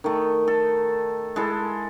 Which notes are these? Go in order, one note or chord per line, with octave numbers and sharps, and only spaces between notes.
D#3 A3
A4
G#3 E4 A4